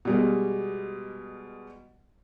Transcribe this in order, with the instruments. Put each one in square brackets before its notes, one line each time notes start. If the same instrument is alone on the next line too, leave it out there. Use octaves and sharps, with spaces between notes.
[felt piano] B2 G3 G#3